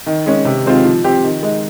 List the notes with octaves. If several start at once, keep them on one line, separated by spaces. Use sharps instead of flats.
D#3
G#3 C#4
C3
D#3 G#3 C4 F4
F3
C4 G4
D#3
G#3 D#4